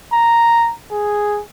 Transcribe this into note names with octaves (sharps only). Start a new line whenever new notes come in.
A#5
G#4